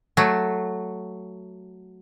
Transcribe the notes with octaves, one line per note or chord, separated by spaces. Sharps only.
F#3 A3